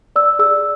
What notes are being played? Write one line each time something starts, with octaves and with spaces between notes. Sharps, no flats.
D5 E6
G#4 E6